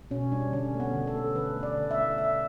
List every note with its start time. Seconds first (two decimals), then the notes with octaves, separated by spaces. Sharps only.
0.11 B2 C#4
0.32 G3 D4
0.52 D3 C#4
0.74 A3
0.80 B3
0.94 D3
1.07 A4
1.14 A3
1.35 D3 B4
1.56 A3
1.63 D5
1.77 D3
1.91 E5
1.97 A3
2.18 D3 E5